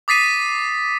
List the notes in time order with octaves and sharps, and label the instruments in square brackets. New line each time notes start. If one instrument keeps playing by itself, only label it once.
[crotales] D6 D#6 A6 B6 C7 D#7